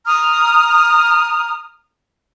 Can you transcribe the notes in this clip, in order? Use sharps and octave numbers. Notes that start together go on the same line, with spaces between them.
A#5 D#6 F6